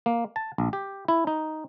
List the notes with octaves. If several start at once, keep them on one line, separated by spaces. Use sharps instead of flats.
A#3
A5
A#1
G4
E4
D#4